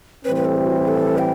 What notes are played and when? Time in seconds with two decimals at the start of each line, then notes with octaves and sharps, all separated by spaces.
0.25 A2 E3 G3 C4 B4
0.36 B4
0.45 A4
0.56 G4
0.66 F#4
0.77 G4
0.88 A4
1.18 G5